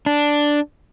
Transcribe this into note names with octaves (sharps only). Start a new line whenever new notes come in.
D4